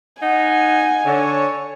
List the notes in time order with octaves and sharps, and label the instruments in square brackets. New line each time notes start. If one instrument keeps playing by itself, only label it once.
[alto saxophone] D#4 [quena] F#5 [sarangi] G#5
[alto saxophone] D3 [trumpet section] C#5